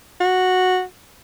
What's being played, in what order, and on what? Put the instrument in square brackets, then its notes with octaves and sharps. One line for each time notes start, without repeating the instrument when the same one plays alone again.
[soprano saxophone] F#4